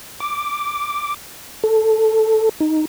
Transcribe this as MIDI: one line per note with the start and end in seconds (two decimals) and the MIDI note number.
0.20 1.14 86
1.64 2.49 69
2.60 2.85 63